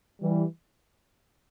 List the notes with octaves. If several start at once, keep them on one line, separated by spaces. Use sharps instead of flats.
E3 G3